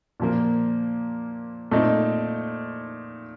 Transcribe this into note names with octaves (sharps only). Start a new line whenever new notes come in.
A#2 F3 A#3
A#2 A3 C4 D#4